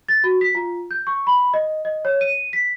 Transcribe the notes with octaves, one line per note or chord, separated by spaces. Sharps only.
A6
F#4
B6
F4
G6
C#6
B5
D#5
D#5
C#5
D#7
B6